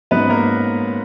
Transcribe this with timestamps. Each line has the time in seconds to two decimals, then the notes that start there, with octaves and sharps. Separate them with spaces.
0.11 G#2 F#3 B3 C#4 B4
0.30 A#3 A#4